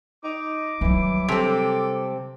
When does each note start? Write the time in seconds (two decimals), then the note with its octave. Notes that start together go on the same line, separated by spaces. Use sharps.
0.24 D#4 D6
0.81 E3 F#3 G3
1.28 C3 C4 A4